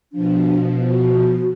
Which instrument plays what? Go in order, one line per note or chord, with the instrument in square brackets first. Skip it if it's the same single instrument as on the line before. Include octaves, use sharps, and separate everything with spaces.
[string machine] B2 F3 [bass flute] D4
[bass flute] F#4